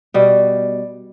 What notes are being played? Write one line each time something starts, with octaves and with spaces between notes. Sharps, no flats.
B2 G3